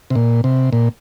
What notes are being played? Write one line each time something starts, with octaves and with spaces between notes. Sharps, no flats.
C3
A#2
C3
A#2